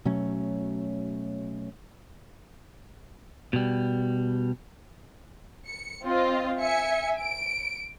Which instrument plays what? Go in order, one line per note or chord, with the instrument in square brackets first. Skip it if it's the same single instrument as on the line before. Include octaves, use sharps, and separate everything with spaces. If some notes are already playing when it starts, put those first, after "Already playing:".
[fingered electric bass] B2 F#3 A3 C#4
[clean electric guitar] B2 G3
[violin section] C#7
C4 F4 D#5
E5 G#5 C#7
D7